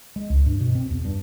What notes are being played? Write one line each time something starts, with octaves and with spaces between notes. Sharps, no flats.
G#3
C#2
G2
B2
C4
E2
G2